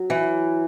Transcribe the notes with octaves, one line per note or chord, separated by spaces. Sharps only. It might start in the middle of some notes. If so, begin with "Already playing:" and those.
Already playing: F#3
E3